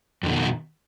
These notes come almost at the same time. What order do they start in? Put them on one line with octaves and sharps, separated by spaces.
F2 D3 B2 D#3